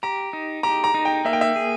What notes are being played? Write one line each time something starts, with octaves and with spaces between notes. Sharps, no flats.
G4 A#5
D#4
G4 A#5
A#5
D#4
G5
A#3 E5
G5
E5
G#4